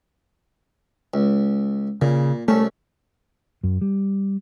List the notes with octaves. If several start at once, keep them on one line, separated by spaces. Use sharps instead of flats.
C#2
A#2 C#3
C2 A3 C#4
F#2
G3